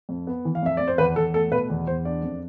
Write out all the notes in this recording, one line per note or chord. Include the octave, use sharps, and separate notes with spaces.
F2
B3
E3
F5
F2 E5
F2 D5
C5
E2 B4
E2 A4
A3 A4
B2 B4
E2
E2 C5
D4 D5
F2